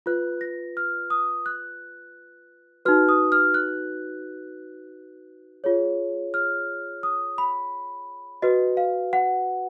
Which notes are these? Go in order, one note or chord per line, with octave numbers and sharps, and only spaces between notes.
F4 B4 F#6
A#6
F6
D#6
F#6
D#4 F#4 B4 F6
D#6
F6
F#6
F4 G#4 C#5
F6
D#6
B5
F#4 B4 D#5
F5
F#5